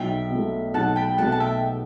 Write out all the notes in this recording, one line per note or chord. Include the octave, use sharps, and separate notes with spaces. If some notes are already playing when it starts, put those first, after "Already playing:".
Already playing: B1 E5 G5
B2 A3
B1 F#5 A5
G5 B5
B2 A3 F#5 A5
A5
E5 G5